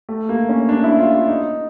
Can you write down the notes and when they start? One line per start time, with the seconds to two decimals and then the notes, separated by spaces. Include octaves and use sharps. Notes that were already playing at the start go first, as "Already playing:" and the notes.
0.09 A3
0.29 A#3
0.49 C#4
0.69 D4
0.84 E4
0.99 F4
1.13 F4
1.28 D#4